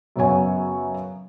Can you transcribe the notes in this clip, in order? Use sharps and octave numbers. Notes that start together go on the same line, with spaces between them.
F#2 C#3 B3 C#5 G#5